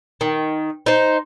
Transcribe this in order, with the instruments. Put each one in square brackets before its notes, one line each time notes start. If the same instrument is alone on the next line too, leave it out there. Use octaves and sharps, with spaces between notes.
[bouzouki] D#3
D#4 C5